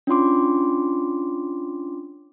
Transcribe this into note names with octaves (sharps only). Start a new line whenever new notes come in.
C#4 D4 F4 C6 D6